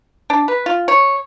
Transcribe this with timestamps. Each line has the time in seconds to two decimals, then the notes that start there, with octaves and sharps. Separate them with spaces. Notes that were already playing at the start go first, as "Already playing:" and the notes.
0.30 D4
0.48 B4
0.66 F4
0.88 C#5